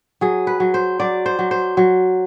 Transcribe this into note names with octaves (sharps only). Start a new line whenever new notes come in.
F#3 G#4
B4
F#3
C5
F#3 D5
C5
F#3
C5
F#3